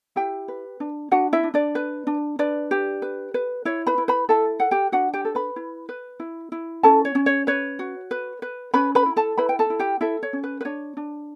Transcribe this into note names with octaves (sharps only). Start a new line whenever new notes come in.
E4 G4 G5
B4
D4
D4 F#4 F#5
E4 E5
D4
D4 D5
B4
D4
D4 B4 D5
G4
B4
B4
E4 C#5
B4 B5
E4
B4 B5
E4 A4 A5
A4 F#5
G4 G5
D4 F#4 F#5
G4 G5
A4
B4 B5
E4
B4
E4
E4
C#4 A4 A5
C#5
C#4
C#5
B4 C#5
F#4
B4
B4
C#4 B4 B5
B4 B5
E4
A4 A5
E4 B4 B5
G5
A4 A5
E4
G4 G5
E4 A4 E5
C#5
C#4
B4
B4
D4 C#5
D4